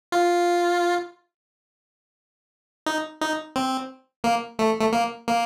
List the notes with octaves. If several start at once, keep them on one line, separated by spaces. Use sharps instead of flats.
F4
D#4
D#4
C4
A#3
A3
A3
A#3
A#3